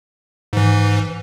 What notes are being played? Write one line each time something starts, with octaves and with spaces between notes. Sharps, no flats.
G#2 E3